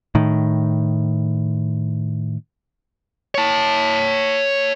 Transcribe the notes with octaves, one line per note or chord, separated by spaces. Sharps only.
A2 D#3
C#5 A5